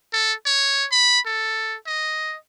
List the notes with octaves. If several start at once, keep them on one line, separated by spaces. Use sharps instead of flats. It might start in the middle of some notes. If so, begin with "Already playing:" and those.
A4
C#5
B5
A4
D#5